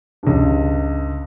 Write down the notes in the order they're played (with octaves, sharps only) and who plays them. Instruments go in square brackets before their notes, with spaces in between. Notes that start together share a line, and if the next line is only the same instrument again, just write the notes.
[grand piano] C#2 G2